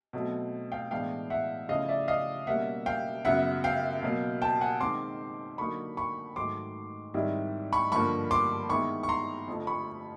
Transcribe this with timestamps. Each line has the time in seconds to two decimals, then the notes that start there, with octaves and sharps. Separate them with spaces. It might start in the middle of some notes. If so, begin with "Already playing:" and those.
0.13 B2 F#3 A3 C4
0.72 F5 G5
0.91 A2 E3 G#3 B3 D4 F5 G5
1.30 E5 F#5
1.69 C#3 F3 A3 C#4 E4 D#5 F5
1.89 D5 E5
2.08 D#5 F5
2.47 B2 G3 A#3 C#4 E5 F#5
2.86 F5 G5
3.25 F#2 C#3 F#3 B3 E5 F#5
3.64 F5 G5
4.02 B2 F#3 A#3
4.42 G5 A5
4.61 F#5 G#5
4.80 D#3 G#3 C4 C6 D6
5.58 D3 F#3 A#3 D#4 B5 C#6
5.97 B5 C#6
6.36 G#2 D#3 F#3 A3 C6 D6
7.14 G#2 D#3 G3 C4 E4
7.73 B5 C#6
7.92 G2 D3 F3 A#3 B5 C#6
8.31 C6 D6
8.70 D#3 G#3 B3 E4 B5 C#6
9.03 C#6
9.09 A#5 C6
9.48 F2 D3 F3 A3
9.67 B5 C#6